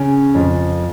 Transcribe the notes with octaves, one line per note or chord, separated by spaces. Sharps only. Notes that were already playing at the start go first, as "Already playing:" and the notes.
Already playing: C#3
F2